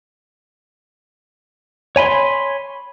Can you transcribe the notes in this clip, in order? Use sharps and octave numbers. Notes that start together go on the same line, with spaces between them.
C#5 G#5 B5 C6